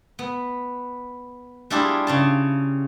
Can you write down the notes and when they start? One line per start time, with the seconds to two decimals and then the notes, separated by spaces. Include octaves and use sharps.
0.19 B3
1.70 G3 D4 E4 F4 G4 G#4
2.07 C#3 C#4 A5